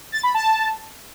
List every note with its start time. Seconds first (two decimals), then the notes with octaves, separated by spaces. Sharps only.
0.12 A6
0.23 B5
0.34 A5